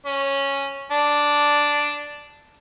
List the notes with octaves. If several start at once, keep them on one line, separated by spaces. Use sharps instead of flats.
C#4
D4